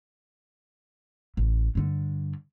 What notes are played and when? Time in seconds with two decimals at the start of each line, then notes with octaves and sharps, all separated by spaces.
1.37 A1
1.75 G2 D3